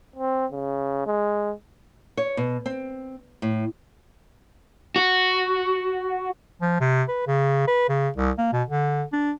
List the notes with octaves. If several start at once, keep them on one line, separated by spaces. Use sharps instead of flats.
C4
C#3
G#3
C#5
B2
C4
A2
F#4
F3
C3
B4
C#3
B4
C#3
C2
A#3
B2
D3
D4